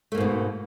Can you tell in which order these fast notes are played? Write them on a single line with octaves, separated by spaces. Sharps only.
A3 A#3 G#2 B2